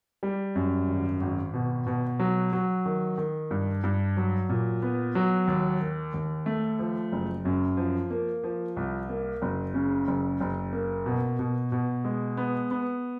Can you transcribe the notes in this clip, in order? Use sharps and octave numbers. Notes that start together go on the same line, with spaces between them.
G3
F#2
G#1
G#1
B2
B2
F#3
F#3
D#3
D#3
G2
G2
F#3
A#2
B3
F#3
D#2
D#3
D#2
A3
F3
F#1
F#2
F3
A#3
F3
C2
A#3
F#1
C#3
F#1
F#1
A#3
B2
B2
B2
G#3
B3
B3